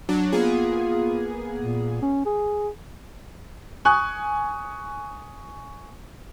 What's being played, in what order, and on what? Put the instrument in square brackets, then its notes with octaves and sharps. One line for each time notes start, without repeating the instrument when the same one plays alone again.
[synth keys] F#3 D4
[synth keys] A#3 B3 G#4 [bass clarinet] F4
[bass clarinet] A#2
C#4
G#4
[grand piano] G#5 C#6 D#6 F#6